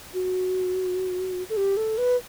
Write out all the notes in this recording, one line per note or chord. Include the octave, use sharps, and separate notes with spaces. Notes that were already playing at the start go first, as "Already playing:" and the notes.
F#4
A4
G4
A4
B4